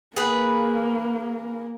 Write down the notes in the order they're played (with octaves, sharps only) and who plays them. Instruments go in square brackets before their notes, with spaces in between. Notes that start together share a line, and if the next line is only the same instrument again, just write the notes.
[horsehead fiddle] A#3 [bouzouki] G#4 B4